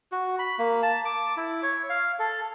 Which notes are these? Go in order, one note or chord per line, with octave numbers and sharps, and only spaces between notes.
F#4
B5
A#3
A5
D6
E4
C#5
F5
A4